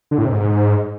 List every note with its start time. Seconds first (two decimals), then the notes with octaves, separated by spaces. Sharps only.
0.11 D3
0.18 A2
0.25 C3
0.32 G#2